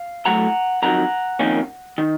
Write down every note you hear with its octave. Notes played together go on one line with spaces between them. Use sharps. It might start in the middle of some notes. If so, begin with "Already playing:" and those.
Already playing: F5
A2 F#3 A3 F#5 A#5
F2 D#3 F#3 F#5 A#5
F2 D#3 A#3 C#4
D#3